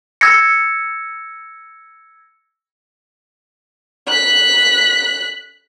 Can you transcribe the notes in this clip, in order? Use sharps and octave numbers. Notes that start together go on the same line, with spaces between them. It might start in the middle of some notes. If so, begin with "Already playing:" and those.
E6 G#6 A#6 C#7
F#6 B6